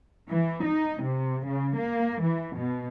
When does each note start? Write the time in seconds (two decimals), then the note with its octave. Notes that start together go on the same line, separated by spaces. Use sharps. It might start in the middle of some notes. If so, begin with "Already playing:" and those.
0.29 E3
0.64 D#4
1.02 C3
1.46 C#3
1.76 A#3
2.21 E3
2.55 B2